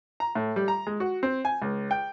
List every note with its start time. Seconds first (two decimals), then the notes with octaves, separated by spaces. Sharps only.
0.20 A#5
0.35 A2
0.56 G3
0.68 A#5
0.87 G#3
1.00 F#4
1.23 C4
1.45 G#5
1.62 C#2
1.91 G5